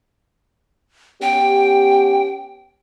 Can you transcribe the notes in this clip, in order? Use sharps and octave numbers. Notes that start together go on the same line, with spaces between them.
B3 C#4 G4 G5